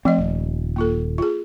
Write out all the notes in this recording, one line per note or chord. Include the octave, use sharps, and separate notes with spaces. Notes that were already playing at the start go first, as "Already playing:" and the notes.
F3 A3 C4 D#5
D#1
A#3 F4 A4
F4 G#4